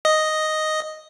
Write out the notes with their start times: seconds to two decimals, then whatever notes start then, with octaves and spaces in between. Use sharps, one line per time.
0.05 D#5